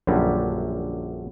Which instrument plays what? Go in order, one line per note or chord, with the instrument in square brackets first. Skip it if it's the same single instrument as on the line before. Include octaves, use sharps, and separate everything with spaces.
[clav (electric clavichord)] A#1 F#2 D3 F#3 G3